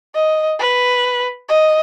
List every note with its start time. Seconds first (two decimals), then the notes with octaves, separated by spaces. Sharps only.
0.15 D#5
0.60 B4
1.49 D#5